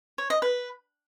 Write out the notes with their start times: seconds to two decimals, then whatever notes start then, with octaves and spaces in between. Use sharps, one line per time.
0.18 C#5
0.30 D#5
0.42 B4